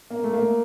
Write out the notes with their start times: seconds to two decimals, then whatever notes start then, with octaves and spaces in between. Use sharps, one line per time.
0.10 A#3
0.24 A3
0.34 A#3